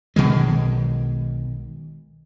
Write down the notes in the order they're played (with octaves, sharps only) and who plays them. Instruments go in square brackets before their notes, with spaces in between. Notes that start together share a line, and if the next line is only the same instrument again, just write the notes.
[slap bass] B1 B2 D#3 G#3